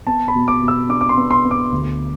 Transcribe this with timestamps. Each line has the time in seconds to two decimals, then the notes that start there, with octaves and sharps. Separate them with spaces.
0.06 B3 A5
0.28 B5
0.35 B2
0.48 D6
0.62 B2
0.68 E6
0.89 D4 D6
1.01 D6
1.09 C6
1.17 B3
1.31 C6
1.45 B3
1.51 D6
1.72 D2